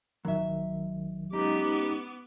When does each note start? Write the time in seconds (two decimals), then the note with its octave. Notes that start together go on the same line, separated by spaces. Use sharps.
0.25 A#1 D#3 F#3 E5
1.32 G#3 B3 C#4 D#4 G4 D6